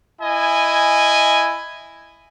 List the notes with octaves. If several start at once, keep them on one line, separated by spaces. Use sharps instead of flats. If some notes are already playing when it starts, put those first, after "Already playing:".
E4 D#5 G#5